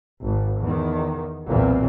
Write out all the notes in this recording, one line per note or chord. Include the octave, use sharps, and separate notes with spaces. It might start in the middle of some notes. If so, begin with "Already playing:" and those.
G#1
E2 D#3
B1 E2 A#2 C4